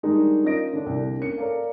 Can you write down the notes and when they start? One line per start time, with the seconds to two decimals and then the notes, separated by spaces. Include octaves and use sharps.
0.03 D#3 G3 G#3 A#3 D4 D#4
0.44 C#4 F4 A#4 D#5 A#6 D7
0.73 D3 D4
0.86 C2 D3
1.19 A#3 C#4 C#7
1.38 A4 A#4 C#5 D5 F5